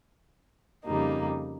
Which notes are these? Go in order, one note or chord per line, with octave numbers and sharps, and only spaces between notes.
F2 C#3 G3 A#3 D#4